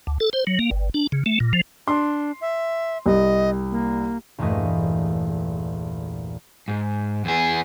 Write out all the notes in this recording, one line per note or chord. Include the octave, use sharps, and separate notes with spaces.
D2
A4
C5
F#3
A#3
G1
D4
C#3
A3
A#2
F3
D4 C6
E5
C2 D#5
A#3
A#1 E2 G2 E3 A3 D#5
G#2
E2 G#4